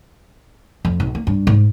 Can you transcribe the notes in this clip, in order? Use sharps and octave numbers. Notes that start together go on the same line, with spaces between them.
F2
B1
A#3
G2
G#2